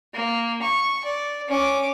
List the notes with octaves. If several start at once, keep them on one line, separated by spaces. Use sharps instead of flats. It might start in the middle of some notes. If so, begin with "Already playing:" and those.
A#3
C#6
D5
C#4 D6